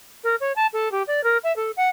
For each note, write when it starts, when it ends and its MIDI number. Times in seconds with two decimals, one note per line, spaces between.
0.24 0.35 70
0.40 0.52 73
0.56 0.66 81
0.73 0.91 69
0.92 1.03 67
1.07 1.23 74
1.24 1.37 70
1.44 1.54 76
1.56 1.71 69
1.77 1.89 78